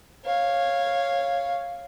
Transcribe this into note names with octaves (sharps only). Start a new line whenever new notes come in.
C#5 F5